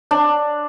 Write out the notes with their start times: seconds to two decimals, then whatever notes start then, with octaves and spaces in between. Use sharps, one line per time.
0.11 D4